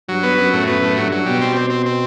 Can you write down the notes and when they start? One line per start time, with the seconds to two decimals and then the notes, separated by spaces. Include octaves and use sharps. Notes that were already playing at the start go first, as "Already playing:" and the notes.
0.09 G2 F#3
0.23 B3
0.38 F#2 F#3
0.53 A2
0.67 F#2 B3
0.82 A2
0.97 G2 F#3
1.12 F#3
1.26 B2 G3
1.42 C4
1.56 C4
1.70 C4
1.86 C4